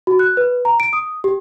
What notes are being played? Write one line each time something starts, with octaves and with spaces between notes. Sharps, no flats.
F#4
F#6
B4
A#5
D7
D#6
G4